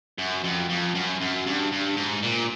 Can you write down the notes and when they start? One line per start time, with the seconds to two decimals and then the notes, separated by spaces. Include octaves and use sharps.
0.18 F#2
0.44 F2
0.70 F2
0.95 F#2
1.21 F#2
1.47 G2
1.72 G2
1.97 G#2
2.23 A#2